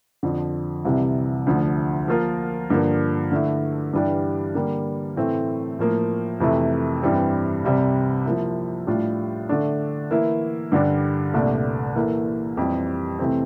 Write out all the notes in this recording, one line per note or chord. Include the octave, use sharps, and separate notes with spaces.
F2 D3 F3
C2 C3 E3 G3
D2 D3 F3
F3 A#3 F4 A#4
G2 D3 F3 A#3
D3 A3 E4
G2 E3 G3 D4 G4
D3 G3 A#3
A2 E3 A3 C4
A2 F3 A#3
F2 C3 E3 A3
G2 E3 G3 C4
C2 C3 G3 C4
F3 A#3 E4
A2 G3 D4 F4
D3 A3 D4
E3 A#3 E4
G2 D3 G3 D4
C2 A#2 A3 D4
E3 A#3 E4 A4
F2 E3 G3 C4 G4
C3 E3 A3 C4